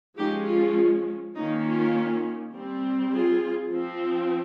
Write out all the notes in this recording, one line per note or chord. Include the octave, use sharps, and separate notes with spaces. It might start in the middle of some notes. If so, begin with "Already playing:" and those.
F3 G#3 C#4 D#4 G4
F4
D#3 A#3 C#4 D#4
F4
G3 C4
F4 G#4
F3 C4